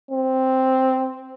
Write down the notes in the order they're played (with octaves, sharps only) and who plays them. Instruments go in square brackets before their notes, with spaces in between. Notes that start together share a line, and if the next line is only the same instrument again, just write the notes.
[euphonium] C4